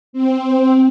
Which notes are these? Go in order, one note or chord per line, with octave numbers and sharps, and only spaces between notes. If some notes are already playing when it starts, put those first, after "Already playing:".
C4